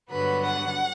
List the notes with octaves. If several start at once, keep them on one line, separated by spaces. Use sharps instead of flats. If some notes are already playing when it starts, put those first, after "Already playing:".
G2 D3 F#3 B3 B4
F#5